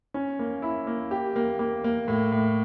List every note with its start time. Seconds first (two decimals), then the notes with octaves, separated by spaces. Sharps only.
0.14 C#4
0.39 A#3
0.62 E4
0.87 A#3
1.11 G4
1.36 A#3
1.59 A#3
1.84 A#3
2.08 A2
2.32 A2